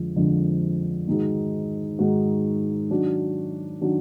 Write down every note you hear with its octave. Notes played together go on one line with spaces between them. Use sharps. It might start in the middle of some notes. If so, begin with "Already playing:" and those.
Already playing: F2 D3 F3 G#3
F2 D3 F3 G#3 D4
G#2 D#3 G#3 D#4 F#4
G#2 D#3 G#3 D#4 F#4
D#3 F#3 D4 F#4
D#3 F#3 D4 F#4